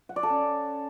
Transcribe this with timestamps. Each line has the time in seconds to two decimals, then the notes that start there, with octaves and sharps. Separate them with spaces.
0.09 F#5
0.16 D5
0.23 A4
0.30 C#4